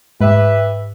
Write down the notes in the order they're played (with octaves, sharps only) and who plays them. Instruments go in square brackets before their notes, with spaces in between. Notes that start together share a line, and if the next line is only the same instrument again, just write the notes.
[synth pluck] G#2 [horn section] G4 B4 E5